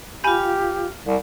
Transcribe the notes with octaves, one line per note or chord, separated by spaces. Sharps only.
F4 G4 F5 G#5 B5 G6
C2